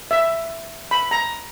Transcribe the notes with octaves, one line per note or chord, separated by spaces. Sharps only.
E5
B5
A#5